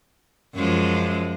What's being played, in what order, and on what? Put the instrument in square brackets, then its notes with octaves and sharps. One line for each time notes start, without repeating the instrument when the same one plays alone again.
[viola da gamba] F#2 F3 G#3